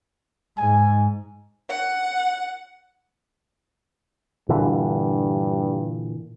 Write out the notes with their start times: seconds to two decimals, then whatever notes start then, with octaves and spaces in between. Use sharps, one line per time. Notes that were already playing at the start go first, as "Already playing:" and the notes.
0.58 G#2 G#5
1.69 F#5
4.49 G2 A#2 D3 E3